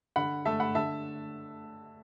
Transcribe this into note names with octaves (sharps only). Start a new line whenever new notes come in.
D3 F#5 B5
A3 E5 A5
F#5 B5
D3 E5 A5